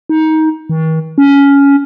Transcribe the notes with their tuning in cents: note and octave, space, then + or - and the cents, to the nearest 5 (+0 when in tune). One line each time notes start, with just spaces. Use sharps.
D#4 +20
D#3 +45
C#4 +15